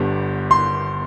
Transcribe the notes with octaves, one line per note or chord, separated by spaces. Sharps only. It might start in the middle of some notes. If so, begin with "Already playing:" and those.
Already playing: G1 G2 D3 G3 B3
C6